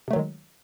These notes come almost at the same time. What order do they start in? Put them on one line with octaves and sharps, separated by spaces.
C3 A3 F#3 D#3 G#3